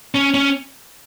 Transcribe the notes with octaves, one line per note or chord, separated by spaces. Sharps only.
C#4
C#4